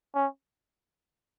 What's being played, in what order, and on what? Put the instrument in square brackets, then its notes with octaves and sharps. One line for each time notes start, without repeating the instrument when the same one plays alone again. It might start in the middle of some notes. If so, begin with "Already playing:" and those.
[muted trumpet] C#4